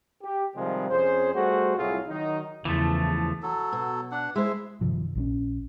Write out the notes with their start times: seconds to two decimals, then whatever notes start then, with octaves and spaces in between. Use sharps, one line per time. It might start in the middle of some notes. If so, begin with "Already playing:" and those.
0.23 G4
0.56 C3 D#3 F3 G3 G#3
0.89 F2 C#4 G#4 C5
1.34 G3 A3 F#4 G#4 C5
1.77 C2 A2 F#3 E4 F4 G#4
2.08 D#3 F#3 D#4
2.65 E2 C#3 E3 F3 A3
3.43 F#3 A4
3.72 B2
4.12 D4 F#5
4.35 G#3 E4 C5 E5
4.81 G2 C3 D#3 F3
5.15 A#1 F3 C#4